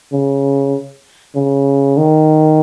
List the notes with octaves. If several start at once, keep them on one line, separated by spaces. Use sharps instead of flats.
C#3
C#3
D#3